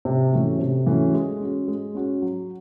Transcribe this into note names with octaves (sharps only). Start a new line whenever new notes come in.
C3
E3 A3 C#4 F#4
C3
E3 A3 C#4 F#4
G#3
C#4 F#4
G#3
C#4 F#4
F#3